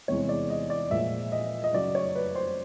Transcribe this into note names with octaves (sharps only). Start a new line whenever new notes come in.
E2 C3 E3 G#3 C#5
D5
D#5
D5
A#2 F3 G#3 E5
D#5
D#5
F#2 C#3 F#3 D5
C#5
B4
C5